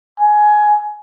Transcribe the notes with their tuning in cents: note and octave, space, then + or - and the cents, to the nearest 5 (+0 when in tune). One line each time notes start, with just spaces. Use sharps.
G#5 +15